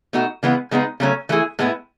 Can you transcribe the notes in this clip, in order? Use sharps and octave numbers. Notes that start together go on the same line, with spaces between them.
B2 A3 D#4 F#4
C#3 E3 G#3 B3
C#3 G#3 B3 D#4
C#3 F#3 A3 C#4
E3 A3 E4 G#4
A2 G#3 B3 E4